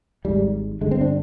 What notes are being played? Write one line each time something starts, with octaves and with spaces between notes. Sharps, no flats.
G#1 G#2 G3
G1 G2 D3 G#3
C4
D4